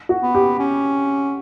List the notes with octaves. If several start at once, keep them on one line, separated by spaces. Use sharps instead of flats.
F#4
B3
G4
C#4